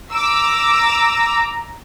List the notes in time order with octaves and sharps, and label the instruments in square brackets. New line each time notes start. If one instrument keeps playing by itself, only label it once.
[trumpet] A#5 [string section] D6 E6